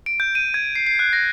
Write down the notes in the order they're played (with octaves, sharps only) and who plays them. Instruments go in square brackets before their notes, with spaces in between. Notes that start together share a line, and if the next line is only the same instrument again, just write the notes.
[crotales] D7
G6
D#7
G#6
C7
C7
F#6
A#6